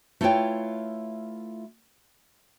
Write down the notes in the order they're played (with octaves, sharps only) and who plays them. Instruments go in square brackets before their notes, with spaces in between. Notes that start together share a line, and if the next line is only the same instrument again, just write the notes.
[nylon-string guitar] A3 E4 F4 B4 C#5 G5